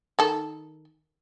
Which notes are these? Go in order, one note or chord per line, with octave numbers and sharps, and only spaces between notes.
D#3 A4